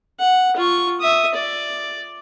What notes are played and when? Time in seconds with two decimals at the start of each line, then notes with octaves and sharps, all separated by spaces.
0.20 F#5
0.56 F4 C#6
1.00 E5 D#6
1.34 D5